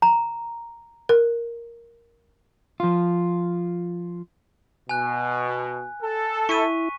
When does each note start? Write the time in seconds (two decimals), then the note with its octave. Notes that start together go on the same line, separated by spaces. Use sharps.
0.02 A#5
1.09 A#4
2.80 F3 F4
4.89 B2 G#5 F#6
6.02 A4
6.49 E4 C#6 B6 D#7